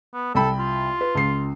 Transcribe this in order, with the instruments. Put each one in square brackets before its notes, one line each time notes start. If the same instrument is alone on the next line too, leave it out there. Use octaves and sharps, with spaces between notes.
[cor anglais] B3
[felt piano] C2 G5 B5 [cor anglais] A4
[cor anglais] F4
[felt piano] B4
C#2 C7